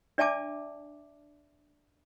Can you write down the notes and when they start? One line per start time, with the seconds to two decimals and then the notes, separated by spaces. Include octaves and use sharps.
0.18 D4 D5 E5 G#5 A5 D6